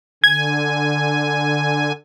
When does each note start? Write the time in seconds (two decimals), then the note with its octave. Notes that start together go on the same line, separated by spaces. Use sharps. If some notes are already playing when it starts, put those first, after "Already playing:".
0.24 D3 G#5 G#6